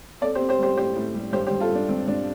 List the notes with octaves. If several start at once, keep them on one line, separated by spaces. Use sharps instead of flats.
C4 A4 D5
G4 C5
C4
G4 C5
G3 G4 C5
A2 G4 C5
A2
G3
G2 G4 C5
G4 C5
G2
F4 A4
G2
D4
G2 C4
G2 D4